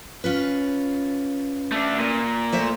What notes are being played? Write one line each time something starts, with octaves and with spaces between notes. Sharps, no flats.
C#4 F4 B4
A3 D4
A#2
A3 C5 E5